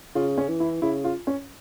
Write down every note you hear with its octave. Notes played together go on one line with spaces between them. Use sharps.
C#3 F4
C#4
E3
E4
C#3 E4
F4
C#4